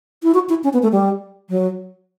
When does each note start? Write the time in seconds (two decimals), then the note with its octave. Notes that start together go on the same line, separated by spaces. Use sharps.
0.23 E4
0.34 F#4
0.49 E4
0.64 C#4
0.73 B3
0.83 A3
0.92 G3
1.50 F#3